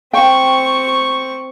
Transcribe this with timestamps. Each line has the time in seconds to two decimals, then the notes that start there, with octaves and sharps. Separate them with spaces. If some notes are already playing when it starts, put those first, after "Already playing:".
0.13 C4 G5 C#6